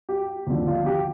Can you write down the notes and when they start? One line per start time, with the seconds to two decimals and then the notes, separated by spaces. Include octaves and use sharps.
0.09 G4
0.47 D#2 D3 F3
0.67 F4
0.86 G4